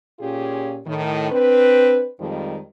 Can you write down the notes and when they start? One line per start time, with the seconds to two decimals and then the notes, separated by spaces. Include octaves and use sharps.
0.20 A#2 C#4 F4 G4 G#4
0.85 A2 D#3
1.31 C4 D4 B4
2.20 F2 D#3 F3 G3 G#3